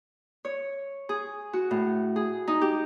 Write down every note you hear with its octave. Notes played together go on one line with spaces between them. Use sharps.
C#5
G#4
F#4
A2
G#4
D#4
G4